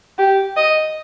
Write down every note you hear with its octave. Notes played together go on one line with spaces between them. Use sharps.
G4
D#5